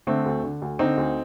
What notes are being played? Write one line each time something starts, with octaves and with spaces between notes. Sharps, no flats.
D3 A3 C4
D2
D3
D2
D3 C4 D#4
D2